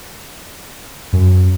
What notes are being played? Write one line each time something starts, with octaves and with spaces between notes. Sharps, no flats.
F#2